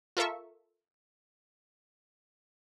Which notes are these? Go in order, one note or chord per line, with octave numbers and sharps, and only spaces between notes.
F4 A4 A#4 E5 C#6